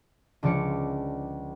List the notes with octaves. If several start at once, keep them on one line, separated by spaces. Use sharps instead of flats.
C#2 D3 F3 D5 C#7